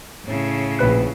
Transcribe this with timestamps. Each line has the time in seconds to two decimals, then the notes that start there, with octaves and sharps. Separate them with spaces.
0.25 A2 C#3
0.79 A#1 B4 F#6